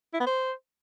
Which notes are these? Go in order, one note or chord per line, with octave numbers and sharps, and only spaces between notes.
E4
B3
C5